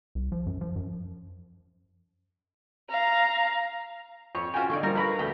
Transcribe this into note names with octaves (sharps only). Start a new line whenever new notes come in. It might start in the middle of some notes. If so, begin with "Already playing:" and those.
C2
F3
F#2
F3
F#2
F5 A#5
F2 C#5
C#4 F4 F#4 C5 G5 G#5
D3 D#4 D5 G5 C#6
F3 G3 A#4
A#4 B4 F5 A#5 B5 C#6
D2 A3 D4 G4